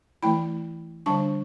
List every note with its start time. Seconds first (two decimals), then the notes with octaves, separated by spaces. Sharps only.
0.23 E3 A3 E4 G5 B5
1.06 D3 G3 D4 A5 C#6